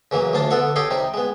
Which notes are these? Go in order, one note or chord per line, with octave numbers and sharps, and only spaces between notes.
C#3 E3 F#3 A#3
D2 A2 D4 F4 A5
D3 B3 A4 F#5 C#6
G4 A4 C#5 D#5 C6
C3 G3 D#4
G#3 B3